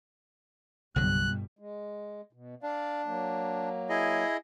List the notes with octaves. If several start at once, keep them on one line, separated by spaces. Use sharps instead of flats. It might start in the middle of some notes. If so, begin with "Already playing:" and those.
G1 C2 B2 D3 F#3 G3 F#6
G#3
B2
D4 D5 F5
F#3 A#3
E4 G#4 D#5